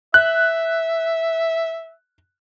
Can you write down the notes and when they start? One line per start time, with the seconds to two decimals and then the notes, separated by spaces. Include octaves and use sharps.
0.14 E5 F#6